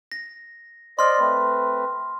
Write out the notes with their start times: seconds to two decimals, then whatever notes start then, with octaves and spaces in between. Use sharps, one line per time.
0.12 A#6
0.99 C5 D5 D#5 C6 F6
1.19 A3 C4 B4